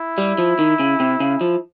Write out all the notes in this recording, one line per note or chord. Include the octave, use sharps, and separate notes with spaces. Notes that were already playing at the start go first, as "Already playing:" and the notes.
Already playing: E4
G3
F3
D#3
C#3
C3
C#3
F3